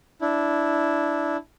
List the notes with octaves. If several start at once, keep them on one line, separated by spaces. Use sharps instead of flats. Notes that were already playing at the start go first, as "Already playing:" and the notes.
D4 E4